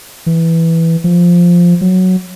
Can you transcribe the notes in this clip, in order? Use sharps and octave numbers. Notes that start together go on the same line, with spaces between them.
E3
F3
F#3